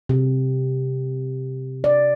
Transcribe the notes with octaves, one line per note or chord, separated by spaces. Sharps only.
C3
D5